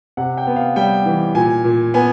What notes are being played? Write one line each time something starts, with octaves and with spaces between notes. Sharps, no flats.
C3 F#5
G5
B3
F5
G3 G5
E3
A#2 G#5
A#2
B3 G#5